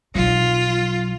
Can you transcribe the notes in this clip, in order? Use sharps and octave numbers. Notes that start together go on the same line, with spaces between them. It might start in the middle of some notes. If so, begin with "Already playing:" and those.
B1 F#3 F4